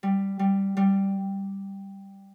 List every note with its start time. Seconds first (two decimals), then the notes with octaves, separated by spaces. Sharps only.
0.03 G3
0.39 G3
0.77 G3